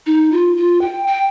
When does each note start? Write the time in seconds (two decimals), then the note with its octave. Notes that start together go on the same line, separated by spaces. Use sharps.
0.06 D#4
0.32 F4
0.57 F4
0.81 G5
1.07 G5